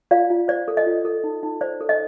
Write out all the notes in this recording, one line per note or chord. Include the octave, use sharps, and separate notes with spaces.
F4 D5 F5
F4
C5 D5
A4
D#5
F4
A4
D#4
D#4
C5 D5
A4
D#5